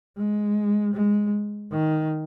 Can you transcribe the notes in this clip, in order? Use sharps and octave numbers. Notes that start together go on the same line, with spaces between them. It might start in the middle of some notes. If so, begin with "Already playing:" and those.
G#3
G#3
D#3